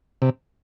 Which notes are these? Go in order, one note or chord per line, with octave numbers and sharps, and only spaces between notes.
C3